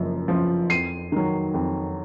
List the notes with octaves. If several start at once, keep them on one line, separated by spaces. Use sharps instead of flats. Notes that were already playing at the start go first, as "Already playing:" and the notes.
Already playing: F#1 F#2 F3
F#2 F3
F2 C7 D#7
D#3 F#3
F2